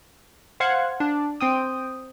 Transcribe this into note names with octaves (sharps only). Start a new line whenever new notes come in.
C5 F5 F#5 G#6
D4
C4 G5 D#6